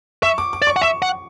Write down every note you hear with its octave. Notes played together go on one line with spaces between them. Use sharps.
E5 C#6
D6
D6
D5
C#6
F#5
E5 C#6
F#5